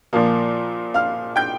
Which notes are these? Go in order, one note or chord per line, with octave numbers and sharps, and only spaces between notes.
A#2 F3 A#3
F5 F6
G5 G6